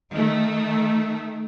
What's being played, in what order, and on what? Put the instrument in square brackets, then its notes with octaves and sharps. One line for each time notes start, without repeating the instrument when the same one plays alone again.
[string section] D#3 A3